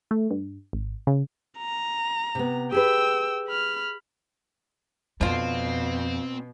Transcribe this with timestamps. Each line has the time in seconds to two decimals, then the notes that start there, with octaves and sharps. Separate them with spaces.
0.11 A3
0.31 G2
0.73 G#1
1.07 C#3
1.58 A#5
2.35 C3 B3
2.72 G4 G#4 B4 G5 E6
3.48 B5 F6
5.21 F2 B2 D3 C4 F4